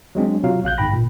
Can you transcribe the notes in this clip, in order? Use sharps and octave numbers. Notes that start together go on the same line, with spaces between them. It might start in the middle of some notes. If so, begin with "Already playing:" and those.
F#3 G#3 C4 D4
C3 F#3 F4 F5
A#1 F5 F#6 G6
G1 G#2 G5 B5 A#6
A#2